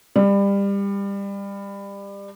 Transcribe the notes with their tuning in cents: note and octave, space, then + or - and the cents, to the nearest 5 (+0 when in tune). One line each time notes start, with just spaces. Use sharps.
G3 +25